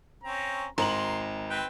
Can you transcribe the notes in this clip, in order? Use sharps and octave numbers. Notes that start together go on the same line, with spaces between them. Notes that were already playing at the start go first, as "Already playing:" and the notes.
C4 C#4 A#5
G#1 A#5 C6 F#7
C4 B4 G5